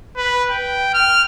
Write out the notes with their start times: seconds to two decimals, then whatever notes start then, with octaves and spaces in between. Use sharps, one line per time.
0.17 B4
0.51 G5
0.94 F6